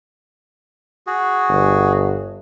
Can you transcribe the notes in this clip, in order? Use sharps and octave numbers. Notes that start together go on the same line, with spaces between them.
F#4 G#4
G1